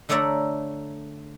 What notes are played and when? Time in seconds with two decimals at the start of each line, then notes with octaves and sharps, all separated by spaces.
0.09 D3 A3 C#5 D5 E5 A#5